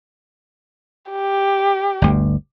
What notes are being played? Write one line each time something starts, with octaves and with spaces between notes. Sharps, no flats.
G4
G1 D2